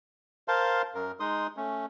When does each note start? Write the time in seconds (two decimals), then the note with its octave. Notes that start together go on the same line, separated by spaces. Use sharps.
0.48 A#4 C5 F5 A5 C6
0.95 F#2 A#4
1.20 G#3 D#4 C6 D#6
1.57 A3 C#4